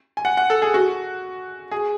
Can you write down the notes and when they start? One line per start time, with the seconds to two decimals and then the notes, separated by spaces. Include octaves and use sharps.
0.17 G#5
0.25 F#5
0.37 F#5
0.50 A4
0.62 G#4
0.74 F#4
1.71 G#4